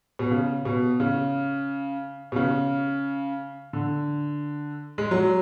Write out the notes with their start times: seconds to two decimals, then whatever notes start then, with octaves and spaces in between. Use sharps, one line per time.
0.19 B2
0.31 C#3
0.65 B2
1.00 C#3
2.32 B2
2.36 C#3
3.73 D3
4.98 G#3
5.11 F#3